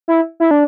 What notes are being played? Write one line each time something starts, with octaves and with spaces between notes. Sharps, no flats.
E4
E4
D4